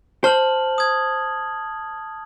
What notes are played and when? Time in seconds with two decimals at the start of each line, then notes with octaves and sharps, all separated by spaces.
0.24 C5 A5 F6 F#7
0.78 D#6 G#6